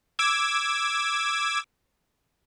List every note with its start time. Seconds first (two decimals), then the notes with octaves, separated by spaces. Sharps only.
0.19 D6 E6 G#6